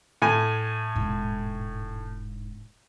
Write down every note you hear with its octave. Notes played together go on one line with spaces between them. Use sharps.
A2 G#5
E1 G#2